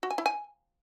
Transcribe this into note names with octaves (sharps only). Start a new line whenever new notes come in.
F#4
G#5
E4
G#5